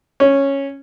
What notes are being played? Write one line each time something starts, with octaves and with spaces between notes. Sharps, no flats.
C#4